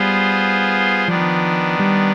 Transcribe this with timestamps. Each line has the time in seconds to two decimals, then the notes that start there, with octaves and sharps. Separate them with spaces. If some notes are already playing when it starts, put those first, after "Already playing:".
Already playing: G3 B3 F4 G#4 C5
1.08 D#3 F3 B3 D4
1.79 G3